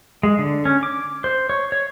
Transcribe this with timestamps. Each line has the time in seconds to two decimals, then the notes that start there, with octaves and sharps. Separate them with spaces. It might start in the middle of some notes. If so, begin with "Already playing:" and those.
0.23 G#3
0.39 D3
0.65 C#4
0.83 D6
1.24 C5
1.50 C#5
1.72 C#5